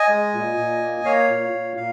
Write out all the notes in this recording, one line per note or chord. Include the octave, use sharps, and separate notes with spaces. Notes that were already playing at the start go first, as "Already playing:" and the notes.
Already playing: D#5 G#5
G#3
A#2
A#2
A#3
A#3 C#5 F5
A#2
A#2
A#2 F5